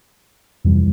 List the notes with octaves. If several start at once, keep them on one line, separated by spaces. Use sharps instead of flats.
F2 C3 E3 G3